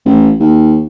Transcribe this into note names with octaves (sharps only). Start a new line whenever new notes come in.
A1
D#2